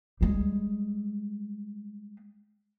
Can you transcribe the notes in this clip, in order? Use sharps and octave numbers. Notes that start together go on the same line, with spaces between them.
G3 G#3